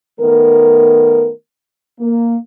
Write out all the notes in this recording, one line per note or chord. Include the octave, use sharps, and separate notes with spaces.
D#3 A3 B3 A#4
A#3